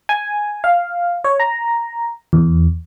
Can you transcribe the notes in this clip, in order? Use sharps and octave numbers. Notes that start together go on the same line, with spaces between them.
G#5
F5
C#5
A#5
E2